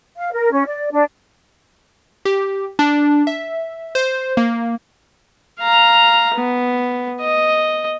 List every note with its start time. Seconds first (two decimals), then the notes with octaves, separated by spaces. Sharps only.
0.16 F5
0.33 A#4
0.52 C#4
0.66 D5
0.92 D4
2.25 G4
2.79 D4
3.27 E5
3.95 C5
4.37 A#3
5.60 F5 A#5
6.34 B3
7.21 D#5